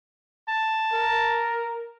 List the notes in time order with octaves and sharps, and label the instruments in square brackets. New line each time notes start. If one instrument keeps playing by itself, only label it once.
[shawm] A5
[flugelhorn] A#4